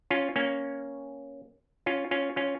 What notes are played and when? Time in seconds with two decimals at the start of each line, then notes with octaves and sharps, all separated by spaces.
0.10 C#4 F4
0.36 A#3 C#4
1.86 C#4 F4
2.11 C#4 F4
2.36 C#4 F4